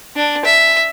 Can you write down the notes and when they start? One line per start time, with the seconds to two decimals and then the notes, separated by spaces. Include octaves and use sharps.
0.16 D4
0.45 E5